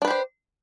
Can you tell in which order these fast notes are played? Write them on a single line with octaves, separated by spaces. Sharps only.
D4 B4 G4 C5